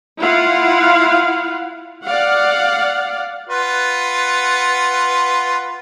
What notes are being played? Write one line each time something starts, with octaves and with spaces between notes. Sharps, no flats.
E4 F4 F5 F#5
D5 F5 F#5
F4 B4 F#5